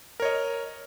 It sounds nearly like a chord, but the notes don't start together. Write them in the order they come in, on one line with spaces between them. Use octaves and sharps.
A#4 C#5 D#5